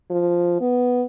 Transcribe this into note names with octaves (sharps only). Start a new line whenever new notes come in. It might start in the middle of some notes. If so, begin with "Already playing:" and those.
F3
B3